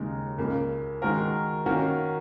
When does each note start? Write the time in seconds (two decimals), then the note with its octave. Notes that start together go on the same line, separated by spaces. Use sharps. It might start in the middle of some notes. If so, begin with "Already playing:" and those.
Already playing: D#2 C#3 G#3 D#4 A#4
0.38 C#2 C#3 A#3
1.02 D#3 G#3 F#4 A#4
1.66 D#3 A#3 C#4 F#4 A#4